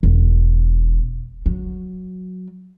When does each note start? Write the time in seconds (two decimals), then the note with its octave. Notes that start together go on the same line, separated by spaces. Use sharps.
0.03 E1
1.46 F#3